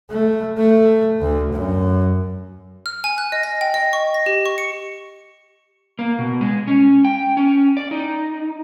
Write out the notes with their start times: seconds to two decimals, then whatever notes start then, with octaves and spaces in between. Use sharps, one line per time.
0.10 A3
0.57 A3
1.21 D2
1.53 F#2
2.86 F6
3.04 G#5
3.18 F#6
3.32 D#5
3.43 A#6
3.61 G5
3.74 D#5
3.93 C#6
4.14 A#6
4.26 G4
4.46 C#6
4.58 C#7
5.99 A#3
6.19 B2
6.41 G#3
6.68 C#4
7.05 G5
7.37 C#4
7.77 D5
7.91 D#4